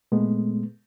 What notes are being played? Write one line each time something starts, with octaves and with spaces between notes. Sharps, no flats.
A#2 G#3 A3 B3